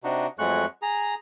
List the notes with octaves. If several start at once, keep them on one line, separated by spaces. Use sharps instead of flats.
C3 D4 D#4 F#4
F2 F#3 G#3 A3 C#6 F#6
G#4 A#5